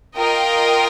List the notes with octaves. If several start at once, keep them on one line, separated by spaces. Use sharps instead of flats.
F4 A#4 D#5 G5